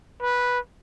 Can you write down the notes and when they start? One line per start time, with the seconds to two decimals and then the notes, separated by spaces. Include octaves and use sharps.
0.22 B4